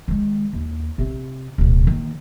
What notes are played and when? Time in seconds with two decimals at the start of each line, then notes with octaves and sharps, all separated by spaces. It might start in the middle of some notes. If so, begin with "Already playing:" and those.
0.08 D#3 G#3
0.53 D#2
0.98 C3 C4
1.58 D1 B2
1.87 D#3 A#3